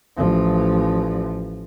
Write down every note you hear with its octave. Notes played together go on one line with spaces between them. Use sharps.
A1 F3